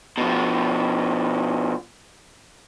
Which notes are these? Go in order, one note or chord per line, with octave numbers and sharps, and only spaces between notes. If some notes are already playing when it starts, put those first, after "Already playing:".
B2 F3